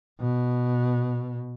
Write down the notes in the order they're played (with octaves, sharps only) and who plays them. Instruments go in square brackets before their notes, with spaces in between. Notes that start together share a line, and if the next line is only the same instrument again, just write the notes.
[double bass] B2